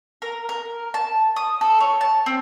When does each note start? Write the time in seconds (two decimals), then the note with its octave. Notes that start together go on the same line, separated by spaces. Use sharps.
0.22 A#4
0.49 A#4
0.94 A5
1.36 D#6
1.61 A4
1.80 C#5
2.01 A5
2.26 C4